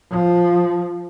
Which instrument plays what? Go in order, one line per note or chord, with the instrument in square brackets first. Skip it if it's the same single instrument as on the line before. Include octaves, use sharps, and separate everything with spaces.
[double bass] F3